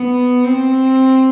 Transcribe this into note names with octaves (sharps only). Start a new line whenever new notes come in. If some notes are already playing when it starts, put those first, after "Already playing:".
Already playing: B3
C4